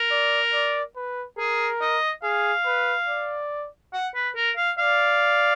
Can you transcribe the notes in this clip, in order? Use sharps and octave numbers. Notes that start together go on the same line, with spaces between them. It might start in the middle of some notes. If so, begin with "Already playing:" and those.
Already playing: A#4
D5
D5
B4
G#4 A#4
D#5
G#4 F5
B4
D5
F#5
B4
A#4
F5
D5 F5